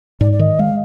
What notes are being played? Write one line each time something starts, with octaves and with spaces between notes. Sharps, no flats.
G#2 D5
D5
D#3 D#5
G#3 F5